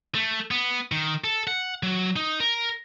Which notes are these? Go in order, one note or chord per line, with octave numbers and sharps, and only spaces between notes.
A3
B3
D#3
A4
F#5
F#3
D#4
A#4